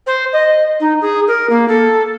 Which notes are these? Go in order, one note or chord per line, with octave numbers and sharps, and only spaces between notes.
C5
D#5
D#4
G#4
A#4
A#3
A4